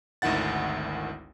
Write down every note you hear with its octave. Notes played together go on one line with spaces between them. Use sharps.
G#1 D2 D#3 E4 F#5 A6